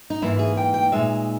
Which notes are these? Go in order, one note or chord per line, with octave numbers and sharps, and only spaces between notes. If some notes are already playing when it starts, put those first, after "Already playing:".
D#4
G#2 E3 A#3 E4
G#4
G5
G5
A#2 G#3 D#4 E5